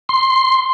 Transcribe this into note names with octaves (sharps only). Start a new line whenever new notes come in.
C6